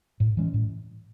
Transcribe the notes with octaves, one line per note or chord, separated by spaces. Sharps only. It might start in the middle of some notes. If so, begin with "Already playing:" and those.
A2
E3 G#3 C#4
A2